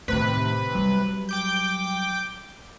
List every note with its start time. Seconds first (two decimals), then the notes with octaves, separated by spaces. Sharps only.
0.08 A2 C3 D#3 B4
0.75 F#3 G3
1.29 G5 D6 G6